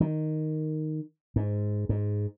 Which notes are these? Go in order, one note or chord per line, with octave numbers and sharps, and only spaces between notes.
D#3
G#2
G#2